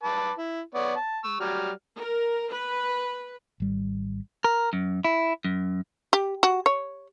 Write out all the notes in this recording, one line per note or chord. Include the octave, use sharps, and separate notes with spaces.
B4 A5 D6
E4
B3 C#5 D5
A5
C#6 E6
F#3 G3 F6
A#4
B4
G#1 G3
A#4
F#2
E4
F#2
G4
F#4
C#5